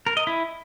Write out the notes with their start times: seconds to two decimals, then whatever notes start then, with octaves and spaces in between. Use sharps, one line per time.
0.07 A#4
0.17 D#5
0.27 E4